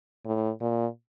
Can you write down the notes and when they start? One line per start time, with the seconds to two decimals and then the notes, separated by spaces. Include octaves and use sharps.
0.25 A2
0.61 A#2